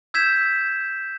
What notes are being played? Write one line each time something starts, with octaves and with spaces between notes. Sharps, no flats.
E6 G6 G#6 B6 E7